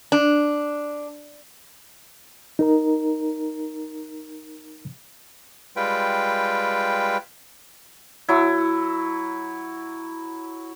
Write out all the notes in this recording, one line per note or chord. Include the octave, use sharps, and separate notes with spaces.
D4
D#4 A#4 A#5
G3 G#3 F4 B4 G5
F#3 E4